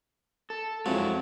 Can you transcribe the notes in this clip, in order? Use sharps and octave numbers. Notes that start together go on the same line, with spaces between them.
A4
F2 F#3 G#3 E4